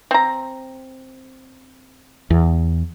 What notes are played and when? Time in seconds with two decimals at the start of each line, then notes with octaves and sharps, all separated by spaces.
0.11 C4 A#5
2.30 E2